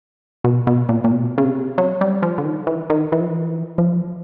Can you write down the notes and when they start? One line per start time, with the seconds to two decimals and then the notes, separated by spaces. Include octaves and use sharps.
0.44 B2
0.67 B2
0.89 A#2
1.04 A#2
1.11 B2
1.38 C#3
1.45 C3
1.78 F#3
2.01 G3
2.22 F3
2.38 D3
2.45 D#3
2.67 E3
2.90 D#3
3.12 E3
3.20 F3
3.29 E3
3.78 F3